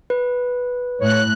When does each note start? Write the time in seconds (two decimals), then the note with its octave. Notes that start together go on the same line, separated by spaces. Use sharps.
0.10 B4
1.01 A2 C#5 F#6